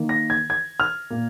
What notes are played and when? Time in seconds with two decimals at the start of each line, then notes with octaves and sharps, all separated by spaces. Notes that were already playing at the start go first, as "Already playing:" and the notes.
Already playing: D#3 A#3
0.09 A#6
0.30 G#6
0.50 G#6
0.80 F6
1.10 A#2 A#3